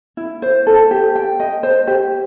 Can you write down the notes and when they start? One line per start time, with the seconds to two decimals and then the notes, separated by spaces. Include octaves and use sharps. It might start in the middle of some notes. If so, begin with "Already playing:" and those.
0.17 E4
0.42 C5
0.67 A4
0.91 G4
1.16 G5
1.40 D#5
1.63 C5
1.87 G4